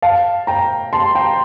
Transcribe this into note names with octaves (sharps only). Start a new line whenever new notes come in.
F5 A5
G5 A#5
A5 C6
G5 A#5